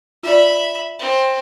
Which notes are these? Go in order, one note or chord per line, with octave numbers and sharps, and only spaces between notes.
F4 D5 E5 B5
C4